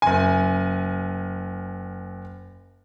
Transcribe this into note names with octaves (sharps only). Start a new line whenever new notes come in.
F#1 G#5